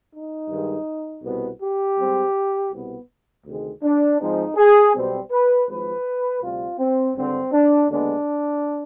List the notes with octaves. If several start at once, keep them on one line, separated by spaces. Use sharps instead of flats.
D#4
G2 D#3 G#3
C2 B2 B3
G4
G#2 G3 C4
C2 B2 B3
D2 C3 D#3 G#3
D4
G#2 F3 G#3 C4 D#4
G#4
B1 B2 G3 C4
B4
G#1 G#2 F3 B4
D2 C3 G3 C4 F4
C4
G#1 G2 D3 C4
D4
D#2 D3 G#3 B3 D4